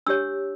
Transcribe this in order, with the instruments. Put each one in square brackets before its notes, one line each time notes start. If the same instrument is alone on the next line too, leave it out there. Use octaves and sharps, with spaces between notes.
[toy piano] D4 G4 C#5 E6